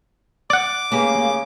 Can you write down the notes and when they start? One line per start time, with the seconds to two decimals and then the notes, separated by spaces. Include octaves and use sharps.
0.50 D5 F#5 D6
0.92 C#3 A#3 B3 G4